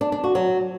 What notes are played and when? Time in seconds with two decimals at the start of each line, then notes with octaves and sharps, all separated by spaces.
0.01 D4
0.12 D4
0.24 F#4
0.35 F#3